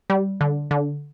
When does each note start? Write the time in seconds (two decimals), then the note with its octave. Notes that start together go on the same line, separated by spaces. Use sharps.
0.10 G3
0.41 D3
0.71 D3